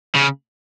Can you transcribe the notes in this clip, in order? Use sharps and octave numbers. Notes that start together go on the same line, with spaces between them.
C#3